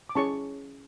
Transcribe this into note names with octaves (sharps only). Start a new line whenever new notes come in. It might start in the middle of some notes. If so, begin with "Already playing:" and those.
D6
C#4 E4 G#4 C#5 A5 C#6